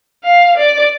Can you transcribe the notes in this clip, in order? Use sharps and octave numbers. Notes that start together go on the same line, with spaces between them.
F5
D5